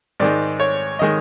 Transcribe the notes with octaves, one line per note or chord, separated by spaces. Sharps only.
G#2 D#3 G#3 D5
C#5
D#3 G#3 D#5